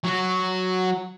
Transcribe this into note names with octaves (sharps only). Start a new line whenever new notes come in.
F#3 F#4